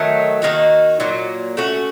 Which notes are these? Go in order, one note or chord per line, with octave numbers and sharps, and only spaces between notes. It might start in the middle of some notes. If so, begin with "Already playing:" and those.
Already playing: D#3 F#3 A3
D#3 A#3 D#4 F#4
A#2 F#3 A#3
A3 C#4 F#4